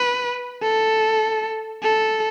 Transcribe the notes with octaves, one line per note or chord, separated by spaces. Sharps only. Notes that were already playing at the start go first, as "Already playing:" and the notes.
Already playing: B4
A4
A4